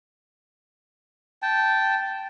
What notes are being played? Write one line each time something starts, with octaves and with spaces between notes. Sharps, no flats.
G5 A5